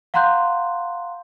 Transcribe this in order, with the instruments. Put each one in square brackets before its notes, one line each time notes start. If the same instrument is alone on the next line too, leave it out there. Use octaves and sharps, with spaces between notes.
[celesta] F5 F#5 A#5 C6 F#6 G6